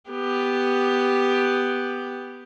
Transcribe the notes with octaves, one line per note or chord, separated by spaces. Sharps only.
B3 G4